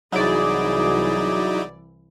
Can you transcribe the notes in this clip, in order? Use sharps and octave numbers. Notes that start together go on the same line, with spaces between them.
C2 E3 F#3 D#4 E4 G#4 D5